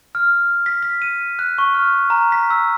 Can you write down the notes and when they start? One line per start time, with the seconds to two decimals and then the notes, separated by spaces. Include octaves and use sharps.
0.15 F6
0.66 B6
0.82 B6
1.02 D#7
1.39 F#6
1.58 C#6
1.74 F6
2.10 A#5
2.32 B6
2.50 E6